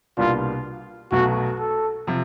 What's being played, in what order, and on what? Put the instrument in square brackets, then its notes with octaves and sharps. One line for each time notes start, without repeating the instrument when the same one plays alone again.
[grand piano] C2 B2 G3 A#3 D4 [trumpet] F4
[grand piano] B1 B2 F#3 A3 [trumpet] F#4
[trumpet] A4
[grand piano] C3 F3